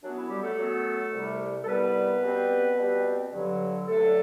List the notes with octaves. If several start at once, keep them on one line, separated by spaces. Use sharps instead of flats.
F#2 F#3 B3 D4
E4
G3 G4
A3 A4
F#2 F#3 B3
C2 C3 G3
A4
C2 C3 G3 B3 B4
B2 G3 C4
B2 G3 C4
G2 D3 F#3
G2 D3 F#3 A3 A4